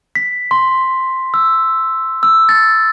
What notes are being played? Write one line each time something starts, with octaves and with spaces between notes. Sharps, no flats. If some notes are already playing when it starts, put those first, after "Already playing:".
B6
C6
E6
E6
A6